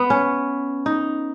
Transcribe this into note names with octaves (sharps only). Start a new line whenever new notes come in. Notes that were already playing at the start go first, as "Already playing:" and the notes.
Already playing: B3
C#4
D#4